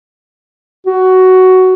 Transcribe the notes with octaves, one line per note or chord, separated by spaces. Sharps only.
F#4